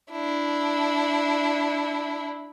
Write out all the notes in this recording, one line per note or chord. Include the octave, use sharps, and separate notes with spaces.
D4 E4